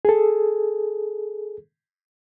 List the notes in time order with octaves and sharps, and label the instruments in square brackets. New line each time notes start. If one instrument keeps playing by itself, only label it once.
[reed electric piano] G#4 A4